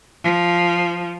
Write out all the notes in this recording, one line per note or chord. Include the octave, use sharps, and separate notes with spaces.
F3